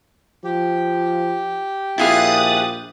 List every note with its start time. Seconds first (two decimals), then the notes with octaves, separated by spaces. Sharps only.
0.44 F3 G4
1.98 A#1 E4 F4 G#4 D#6 F#6 A6